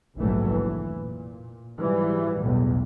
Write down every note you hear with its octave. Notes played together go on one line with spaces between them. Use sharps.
F1 A#1 G#2 E3 F#3 A3
E3
A#2
G#2 E3 F#3 G3
B1 E2 A2